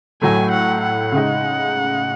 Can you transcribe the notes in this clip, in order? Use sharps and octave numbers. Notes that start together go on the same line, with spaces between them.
A2 F#3 A3 G#5
F#5
F#5
C#3 G#3 D#4